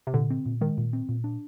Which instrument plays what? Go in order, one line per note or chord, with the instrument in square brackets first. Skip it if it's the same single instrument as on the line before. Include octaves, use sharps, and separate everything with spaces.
[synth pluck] C3
[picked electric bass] A#2 [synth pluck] D3
[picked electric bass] C4
A#2
[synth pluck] D#3 [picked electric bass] G#3
[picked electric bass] A#2
C4
A#2
D4